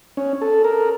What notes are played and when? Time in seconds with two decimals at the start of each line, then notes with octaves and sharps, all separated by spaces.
0.17 C#4
0.41 A4
0.64 A#4